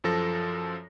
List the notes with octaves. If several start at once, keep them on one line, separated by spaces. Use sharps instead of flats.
F#2 F3 A4 A#6